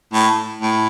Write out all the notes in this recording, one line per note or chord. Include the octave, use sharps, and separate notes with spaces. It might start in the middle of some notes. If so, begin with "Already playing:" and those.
A2
A2